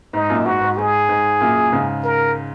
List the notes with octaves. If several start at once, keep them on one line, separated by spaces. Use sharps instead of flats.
G#2 D#4
F#2 A#2
G#2 F#4
G#2
G#2 G#4
G#2
F#2 A#2
G#2 C#3
A#4